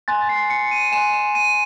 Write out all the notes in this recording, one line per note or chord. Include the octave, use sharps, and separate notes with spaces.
G#5 C6 F#6 A6
C7
C#7
D#7
G#5 C6 F#6 E7
E7
D#7